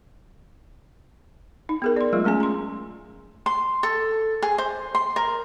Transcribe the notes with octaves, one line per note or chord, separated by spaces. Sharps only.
D#4
B3 G#4 A#4
D5 C6
F#3 G#3 A3 F4
G#3 A3 C#4 G#4 G#5
A#5 C6
C6
A4
G#4
C5
C6
A#4